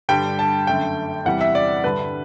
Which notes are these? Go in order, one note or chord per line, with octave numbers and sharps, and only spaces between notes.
G2 D3 G3 G5
A5
F#2 D3 A3 G5
E2 C3 E3 G3 F#5
E5
D5
G2 D3 G3 B4